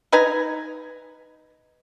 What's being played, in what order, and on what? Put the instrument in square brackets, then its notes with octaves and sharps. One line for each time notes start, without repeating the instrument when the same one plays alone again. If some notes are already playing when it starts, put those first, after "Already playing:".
[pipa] D#4 B4 G#5 A#5